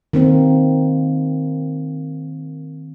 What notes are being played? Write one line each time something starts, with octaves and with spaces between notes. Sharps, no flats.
D#3 A#3 C4